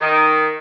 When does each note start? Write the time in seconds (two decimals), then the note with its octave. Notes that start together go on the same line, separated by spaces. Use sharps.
0.01 D#3